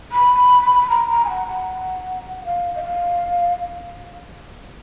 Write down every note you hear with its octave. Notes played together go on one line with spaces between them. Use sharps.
B5
A#5
A#5
G#5
F#5
F#5
F5
D#5
F5